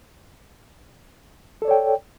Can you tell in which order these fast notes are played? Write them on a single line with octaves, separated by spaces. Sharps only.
A4 D5 C#5 G5